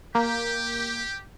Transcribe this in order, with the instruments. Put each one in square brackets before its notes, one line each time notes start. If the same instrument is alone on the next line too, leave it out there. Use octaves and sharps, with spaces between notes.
[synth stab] A#3 [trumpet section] G4